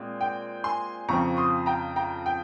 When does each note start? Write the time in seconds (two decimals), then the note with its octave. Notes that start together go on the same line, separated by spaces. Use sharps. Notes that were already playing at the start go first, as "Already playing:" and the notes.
Already playing: A#2 G#3 C4
0.21 G5
0.64 G#5 C6
1.08 F2 C#3 F3 C4 A#5 C#6
1.37 C6 D#6
1.66 G5 A#5
1.96 G5 A#5
2.26 G5